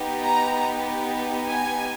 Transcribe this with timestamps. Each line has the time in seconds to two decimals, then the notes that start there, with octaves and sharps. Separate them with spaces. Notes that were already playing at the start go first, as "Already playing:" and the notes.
Already playing: B3 D#4 G4
0.23 A#5
1.47 G#5